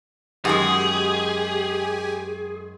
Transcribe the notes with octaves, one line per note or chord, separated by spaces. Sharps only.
F#2 D#3 G#3 G4 G#4 G#5